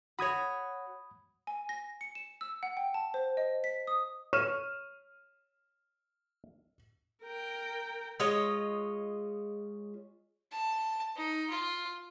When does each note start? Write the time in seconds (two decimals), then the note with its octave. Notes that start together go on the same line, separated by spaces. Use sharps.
0.19 F#4 C#5 B5 D#6 G#6
1.47 G#5
1.69 A#6
2.01 C#7
2.15 E7
2.41 E6
2.63 F#5
2.77 G5
2.94 A5
3.14 C5
3.37 D#5
3.64 B6
3.87 D#6
4.33 C#5 F6 D#7 E7
7.23 A#4 G5
8.20 G#3 F4 C#5 D#5
10.52 A5
11.16 D#4
11.50 F4